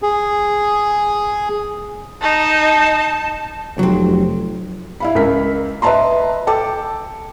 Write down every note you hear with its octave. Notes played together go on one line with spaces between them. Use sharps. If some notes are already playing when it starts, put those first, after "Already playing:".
G#4
D#4 A5
F1 F#3 C4
E4 F5 B5
C#2 A#4 B6
B4 D#5 E5 A5 A#5 C6
A4 G5 A5 D6